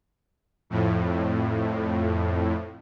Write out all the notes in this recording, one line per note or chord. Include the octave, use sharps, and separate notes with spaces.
F2 A2